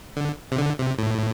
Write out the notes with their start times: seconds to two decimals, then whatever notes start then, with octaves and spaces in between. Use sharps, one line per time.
0.17 D3
0.52 C3
0.58 D3
0.78 C3
0.98 A2